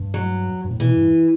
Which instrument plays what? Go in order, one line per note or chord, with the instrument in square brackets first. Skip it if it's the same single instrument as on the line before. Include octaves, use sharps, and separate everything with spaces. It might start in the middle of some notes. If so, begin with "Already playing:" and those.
Already playing: [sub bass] G2
[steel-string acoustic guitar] F#3
[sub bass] G2
A2
[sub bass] B2 [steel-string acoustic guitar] E3
[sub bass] G2